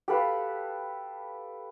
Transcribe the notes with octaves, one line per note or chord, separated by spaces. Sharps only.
G4 A4 B4 F5